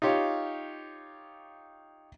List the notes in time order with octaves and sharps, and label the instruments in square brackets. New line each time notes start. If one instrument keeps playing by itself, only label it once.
[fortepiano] D#4 F4 G4 C#5 F5